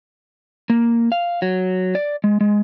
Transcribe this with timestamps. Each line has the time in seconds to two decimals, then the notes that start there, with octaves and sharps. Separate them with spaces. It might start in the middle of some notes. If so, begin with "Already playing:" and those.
0.70 A#3
1.12 F5
1.42 F#3
1.95 D5
2.24 G#3
2.41 G#3